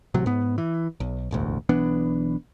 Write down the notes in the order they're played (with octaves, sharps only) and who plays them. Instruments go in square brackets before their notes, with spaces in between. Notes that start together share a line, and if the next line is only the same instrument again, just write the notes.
[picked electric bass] A1 C3 F#3
G#2 B3
E3
B1
E1 A1 D2
B1 E3 B3 D4